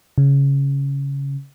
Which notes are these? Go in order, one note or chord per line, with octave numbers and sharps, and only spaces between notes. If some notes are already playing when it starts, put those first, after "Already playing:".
C#3